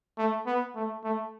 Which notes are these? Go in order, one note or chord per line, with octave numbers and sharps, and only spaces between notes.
A3
B3
A3
A3